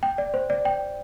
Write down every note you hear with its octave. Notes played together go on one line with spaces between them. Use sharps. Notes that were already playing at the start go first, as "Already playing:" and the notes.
G5
D5
C5
D5
G5